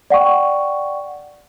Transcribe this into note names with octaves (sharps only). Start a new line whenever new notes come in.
D5 F#5 G5 C#6